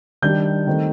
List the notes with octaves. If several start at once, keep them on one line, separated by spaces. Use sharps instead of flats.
D#3 G3 D4 G6
D#3 A3 C4 D#4